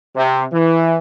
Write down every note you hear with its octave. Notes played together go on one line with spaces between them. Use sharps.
C3
E3